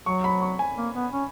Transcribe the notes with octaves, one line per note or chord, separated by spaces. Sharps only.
F#3 C#6
B5
C#6
G#5
A#3
B3
C#4